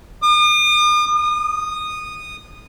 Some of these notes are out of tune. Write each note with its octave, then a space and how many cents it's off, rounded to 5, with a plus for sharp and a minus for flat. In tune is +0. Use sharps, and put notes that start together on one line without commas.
D#6 -45
D#6 -15